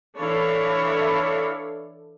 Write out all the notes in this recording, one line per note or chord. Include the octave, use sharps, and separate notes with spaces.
E3 D4 E4 A4 C#5 F5